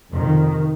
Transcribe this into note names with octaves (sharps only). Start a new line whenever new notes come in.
F2 C3 D#3